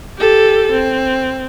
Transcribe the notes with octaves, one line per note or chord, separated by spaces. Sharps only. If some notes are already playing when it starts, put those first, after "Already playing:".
G4 A4
C4